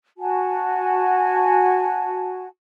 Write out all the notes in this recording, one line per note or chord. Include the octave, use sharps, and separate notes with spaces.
F#4 G#5 A5